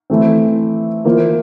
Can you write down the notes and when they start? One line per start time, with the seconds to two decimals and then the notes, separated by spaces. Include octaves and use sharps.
0.10 E3 A3 C4
1.05 E3 A#3 F4 C5